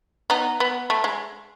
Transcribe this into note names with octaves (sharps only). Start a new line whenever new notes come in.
B3 D#4
B3
A3
G#3